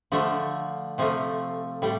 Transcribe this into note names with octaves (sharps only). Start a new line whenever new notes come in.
D3 F3 A3
C3 F3 A3
A2 G3